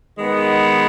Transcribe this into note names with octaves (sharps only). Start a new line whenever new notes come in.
D#3 G#3 B3